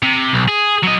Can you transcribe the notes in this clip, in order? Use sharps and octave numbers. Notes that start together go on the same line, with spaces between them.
C3
B1
G#4
F#3 D#5